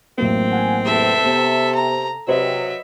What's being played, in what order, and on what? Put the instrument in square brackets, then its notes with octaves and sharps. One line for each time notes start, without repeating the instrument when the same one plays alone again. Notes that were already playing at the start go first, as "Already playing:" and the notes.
[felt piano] A1 F#3 A#3 [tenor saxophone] C4
[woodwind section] F#5 G#5
[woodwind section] E2 C3 [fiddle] A4 E5
[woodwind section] C3 [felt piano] B3
[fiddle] A#5
[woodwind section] C3 [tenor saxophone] F#3 [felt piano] B4 C5 D#5 [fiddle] E5